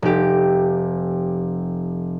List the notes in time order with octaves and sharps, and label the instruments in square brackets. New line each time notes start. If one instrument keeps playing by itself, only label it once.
[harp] F1 G4